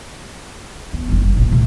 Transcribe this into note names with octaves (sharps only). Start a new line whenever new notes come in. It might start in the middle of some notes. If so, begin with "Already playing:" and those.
B3
F#1 G3
A#1 C3
C3 A3